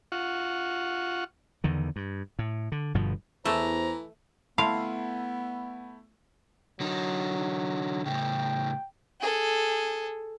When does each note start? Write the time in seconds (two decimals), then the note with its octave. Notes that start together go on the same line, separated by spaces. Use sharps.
0.12 F4 F#5 C#6
1.64 E2 D3 D#3
1.96 G2
2.39 A2
2.72 D3
2.94 G1 G2 B2 F3
3.45 E2 E3 A3 C5 A#5
4.58 A3 B3 E4 F5 A5 B5 C6
6.80 D3 F#3 D#4
8.06 A2 C#3 G5
9.21 G#4 A4